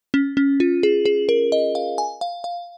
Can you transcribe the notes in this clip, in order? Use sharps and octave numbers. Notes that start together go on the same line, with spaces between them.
C#4
C#4
F4
G#4
G#4
A#4
D#5
F5
G#5
F5
F5